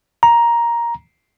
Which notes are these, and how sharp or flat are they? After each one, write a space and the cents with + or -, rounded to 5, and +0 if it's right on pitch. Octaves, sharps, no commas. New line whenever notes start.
A#5 +10